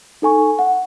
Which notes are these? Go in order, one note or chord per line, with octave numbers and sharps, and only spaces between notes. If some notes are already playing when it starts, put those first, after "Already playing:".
D#4 A4 G#5 C#6
F#5